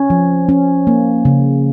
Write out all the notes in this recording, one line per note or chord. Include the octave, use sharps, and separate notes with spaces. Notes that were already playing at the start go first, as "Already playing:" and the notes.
Already playing: C#4
F3
C#4
A#3
C#3